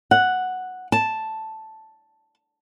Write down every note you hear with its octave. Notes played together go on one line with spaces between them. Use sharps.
F#5
A5